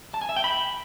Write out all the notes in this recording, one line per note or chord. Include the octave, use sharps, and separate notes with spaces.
A5
G#5
E5
G5
B5